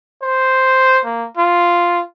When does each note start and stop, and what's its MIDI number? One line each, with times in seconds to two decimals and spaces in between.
0.22 0.99 72
1.05 1.27 58
1.37 2.02 65